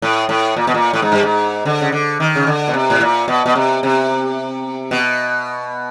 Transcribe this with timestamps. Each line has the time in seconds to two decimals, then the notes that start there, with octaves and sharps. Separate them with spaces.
0.02 A2
0.29 A2
0.56 A#2
0.67 B2
0.74 A#2
0.93 A2
1.02 G#2
1.12 G2
1.23 G#2
1.65 D3
1.81 C#3
1.92 D3
2.20 D#3
2.36 C#3
2.47 D3
2.68 B2
2.74 C3
2.90 A2
3.01 A#2
3.28 B2
3.46 B2
3.55 C3
3.83 C3
4.91 B2